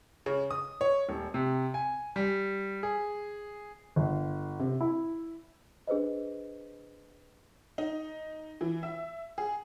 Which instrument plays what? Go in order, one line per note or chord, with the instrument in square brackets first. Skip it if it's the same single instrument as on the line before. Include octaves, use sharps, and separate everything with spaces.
[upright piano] C#3
D#6
C#5
D#1
[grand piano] C3
G#5
G3
G#4
[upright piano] G1
C3
E4
[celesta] D4 G#4 B4 C5 D#5
[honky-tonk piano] D#4
E3
E5
G#4